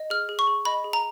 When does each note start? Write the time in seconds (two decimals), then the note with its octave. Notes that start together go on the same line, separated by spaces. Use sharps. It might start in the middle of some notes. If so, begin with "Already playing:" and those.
Already playing: D#5
0.10 G#4 F6
0.29 G#4
0.39 C#6
0.47 G#4
0.65 D#5 B5
0.84 G#4
0.93 A#5